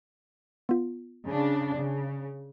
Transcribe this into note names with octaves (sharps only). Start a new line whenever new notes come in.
B3 F4
C#3 D4
C#3